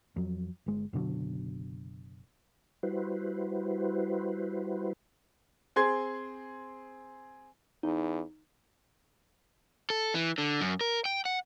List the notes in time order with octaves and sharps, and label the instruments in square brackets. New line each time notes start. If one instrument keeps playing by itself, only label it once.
[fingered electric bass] F2 F#3
G1 G#3
F#1 B2 D3 F#3
[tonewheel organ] G3 E4 F#4 B4 C5
[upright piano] C4 G#4 C6 G#6
[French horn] E2 [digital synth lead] D#4
[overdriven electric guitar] A4
E3
D3
F#2
A#4
G5
F#5